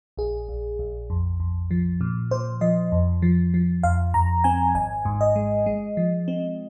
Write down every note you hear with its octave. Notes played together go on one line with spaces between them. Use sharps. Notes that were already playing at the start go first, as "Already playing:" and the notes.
A#1 G#4
A#1
A#1
F2
F2
F3
A#2
A#2 C5
F3 D#5
F2
F3
F3
F2 F5
F2 A#5
C4 G#5
G#1 G#5
G#2
D#5
G#3
G#3
F3
C4